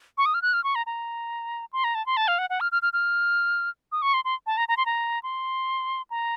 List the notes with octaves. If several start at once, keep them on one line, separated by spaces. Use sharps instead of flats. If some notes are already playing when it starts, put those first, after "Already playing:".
C#6
D#6
F6
F#6
F6
C#6
A#5
A#5
C6
A#5
A5
C6
A5
F5
F#5
F#5
F6
F6
F6
F6
D#6
C#6
C6
C6
A5
A#5
A#5
C6
A#5
C6
A#5